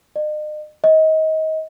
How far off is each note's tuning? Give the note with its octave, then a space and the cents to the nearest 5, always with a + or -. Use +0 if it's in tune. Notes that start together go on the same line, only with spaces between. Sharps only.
D#5 -45
D#5 +25